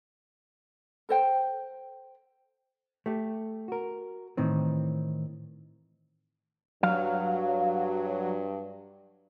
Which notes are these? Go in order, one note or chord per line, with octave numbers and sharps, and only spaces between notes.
A4 C5 G5
A3 G4
F#4 A#4
A2 D#3 E3 C4
G2 F#3 F5